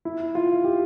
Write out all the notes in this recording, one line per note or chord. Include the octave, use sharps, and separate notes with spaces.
E4
F4
G4